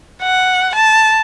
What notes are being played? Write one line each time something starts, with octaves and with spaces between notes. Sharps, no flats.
F#5
A5